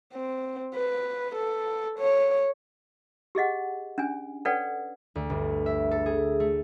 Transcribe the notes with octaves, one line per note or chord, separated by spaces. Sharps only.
C4
B4
A4
C#5
G4 G#4 D#5 F#5
C#4 D4 G#5
A4 B4 C#5 D5 F#5 G5
D2
G1
E5
A4
G#4
A3